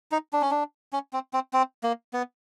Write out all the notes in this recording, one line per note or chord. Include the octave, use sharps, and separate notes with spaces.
D#4
D4
C#4
D4
C#4
C4
C4
C4
A#3
B3